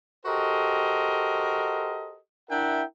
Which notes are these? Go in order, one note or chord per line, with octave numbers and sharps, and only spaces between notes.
F#4 G4 A4 A#4 C5 D#5
D4 E4 A#4 E5 F#5 G5